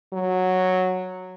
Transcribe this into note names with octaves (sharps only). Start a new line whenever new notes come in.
F#3